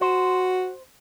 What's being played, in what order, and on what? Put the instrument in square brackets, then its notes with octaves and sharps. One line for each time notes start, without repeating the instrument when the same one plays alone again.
[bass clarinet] F#4 [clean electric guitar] C5